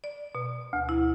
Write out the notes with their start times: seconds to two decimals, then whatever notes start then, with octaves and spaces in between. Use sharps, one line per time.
0.04 D5
0.35 B2
0.73 D2
0.89 E4